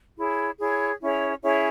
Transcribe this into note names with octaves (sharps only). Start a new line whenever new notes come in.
E4 G#4 C#5
E4 G#4 C#5
C#4 E4 G#4 C#5
C#4 E4 G#4 C#5